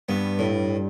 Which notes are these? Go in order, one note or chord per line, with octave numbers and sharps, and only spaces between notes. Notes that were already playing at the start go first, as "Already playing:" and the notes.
G2 B3
A2